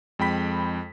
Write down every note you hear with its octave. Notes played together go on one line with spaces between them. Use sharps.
F2 G#3 G5 B5 B6